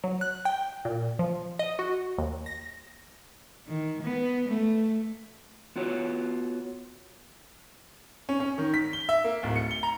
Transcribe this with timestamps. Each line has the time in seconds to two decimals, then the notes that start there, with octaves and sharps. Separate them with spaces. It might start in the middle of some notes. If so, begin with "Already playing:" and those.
0.04 F#3
0.21 F#6
0.45 G5
0.85 A#2
1.19 F3
1.59 D#5
1.79 F#4
2.18 D#2
2.46 A#6
3.67 D#3
4.02 B3
4.48 A3
5.76 B3 F4 F#4 C#5
8.29 C#4
8.40 C#4
8.58 D#3
8.74 B6
8.93 G7
9.09 E5
9.24 A#3
9.43 D1
9.56 C#7
9.71 G7
9.83 A#5